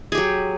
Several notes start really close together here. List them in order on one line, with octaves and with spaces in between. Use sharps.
G#4 G4 F#3